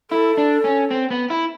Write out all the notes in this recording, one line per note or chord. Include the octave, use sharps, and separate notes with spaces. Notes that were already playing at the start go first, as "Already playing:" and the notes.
E4 A4
D4
C#4
C4
B3
E4